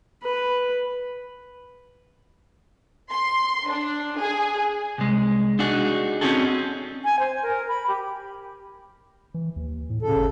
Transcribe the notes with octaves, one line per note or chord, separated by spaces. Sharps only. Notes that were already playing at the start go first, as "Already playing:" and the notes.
B4
C6
D4
G#4
C2 G#3
D4 D#4 F#4 G#4
C4 C#4 D#4 F#4 G#4 A4
G#5
C5
A#4
B5
G4
E3
D#2
A2
A#2 C#3 A4
G1